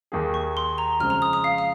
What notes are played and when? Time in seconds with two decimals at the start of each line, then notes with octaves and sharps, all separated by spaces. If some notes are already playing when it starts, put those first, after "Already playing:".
0.12 D#2 D#3 A#3 D#4 G#4
0.34 C#6
0.57 C6
0.78 A#5
0.99 F2 C#3 F3 G#3 C4 F6
1.10 A#5
1.22 D#6
1.33 D#6
1.44 F5
1.58 F5